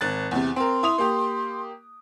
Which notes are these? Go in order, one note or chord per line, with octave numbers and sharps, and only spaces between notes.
G#1 F#6 A6
E2 C3
C4 A#4 C6
E4 D#6 F7
A#3 G4